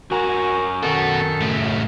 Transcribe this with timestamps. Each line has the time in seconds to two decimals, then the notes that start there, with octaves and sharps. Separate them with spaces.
0.11 F#2 F#4 A#4 G#5 A#5
0.83 D#3 B3 F#4 A4
1.41 A2 C#3